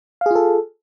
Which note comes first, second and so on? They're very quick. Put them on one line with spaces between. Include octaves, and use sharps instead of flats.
F5 G#4 F4 A4